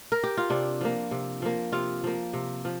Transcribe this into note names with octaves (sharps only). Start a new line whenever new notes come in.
A#4
G4
F4
C3 D4
F3 A#3
C3
F3 A#3
C3 F4
F3 A#3
C3
F3